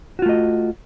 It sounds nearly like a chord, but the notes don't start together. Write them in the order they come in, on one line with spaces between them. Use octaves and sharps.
F#4 F4 A3 D#5